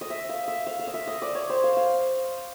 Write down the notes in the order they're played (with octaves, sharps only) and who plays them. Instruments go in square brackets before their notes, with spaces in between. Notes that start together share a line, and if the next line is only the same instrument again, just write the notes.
[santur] D#5
E5
F5
E5
F5
F5
D#5
E5
D#5
D5
C#5
C5
F5
F5